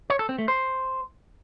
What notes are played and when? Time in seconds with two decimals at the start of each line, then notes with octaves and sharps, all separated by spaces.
0.10 C#5
0.19 A4
0.29 C4
0.38 A3
0.48 C5